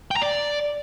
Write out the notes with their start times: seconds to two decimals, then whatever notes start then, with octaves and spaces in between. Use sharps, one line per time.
0.11 G5
0.16 A#5
0.22 D5